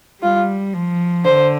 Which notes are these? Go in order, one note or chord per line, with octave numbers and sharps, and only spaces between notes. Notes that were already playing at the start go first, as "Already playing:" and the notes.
G3 F4
F3
D3 C5